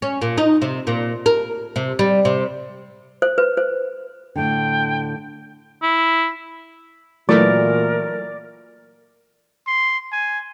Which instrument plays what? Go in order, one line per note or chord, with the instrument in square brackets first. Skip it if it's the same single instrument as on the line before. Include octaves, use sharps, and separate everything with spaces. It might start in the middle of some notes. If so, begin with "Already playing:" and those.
[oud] C#4
A#2
D#4
C3
A#2
A#4
C3
G3
C3
[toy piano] C5
B4
C5
[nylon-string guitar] A2 D3 [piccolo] G5
[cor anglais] E4
[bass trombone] A#2 [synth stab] E3 F#3 A3 [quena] A#4 [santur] D5
[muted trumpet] C6
G#5